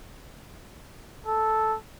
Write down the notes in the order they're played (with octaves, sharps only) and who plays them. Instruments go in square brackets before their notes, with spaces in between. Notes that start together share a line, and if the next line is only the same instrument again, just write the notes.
[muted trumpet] A4